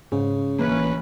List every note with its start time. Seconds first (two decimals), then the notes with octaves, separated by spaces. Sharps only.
0.12 G#2 C#3
0.59 A1 E3 A#3 C#4 B4